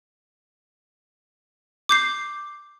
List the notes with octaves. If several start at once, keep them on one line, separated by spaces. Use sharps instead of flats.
D6 G6 C7